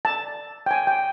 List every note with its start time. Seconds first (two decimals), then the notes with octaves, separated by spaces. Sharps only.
0.05 A5
0.66 G5
0.71 G#5
0.87 G5